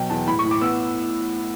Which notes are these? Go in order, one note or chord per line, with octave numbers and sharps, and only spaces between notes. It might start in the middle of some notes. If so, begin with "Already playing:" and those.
Already playing: B2 F#3 G5
E2 A5
A2 B5
C#6
A2
D6
B3 E6